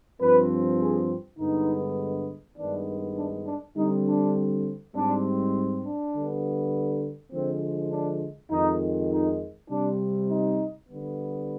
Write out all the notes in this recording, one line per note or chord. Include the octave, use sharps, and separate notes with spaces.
G2 F3 C4 B4
G#4
G2 D3 G#3 B3 D#4
G2 D#3 G#3 B3 D4
D4
D4
D3 G3 C4 D#4
D4
G#2 G3 C4 D4
D4
D3 G3 B3
D3 F3 G#3 C4
D4
F2 D#3 G#3 D#4
D#4
C3 G3 C4 D4
D#4
D3 G3 B3